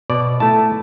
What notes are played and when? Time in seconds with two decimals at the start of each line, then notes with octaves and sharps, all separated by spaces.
0.10 B2 D5
0.40 A3 E4 A5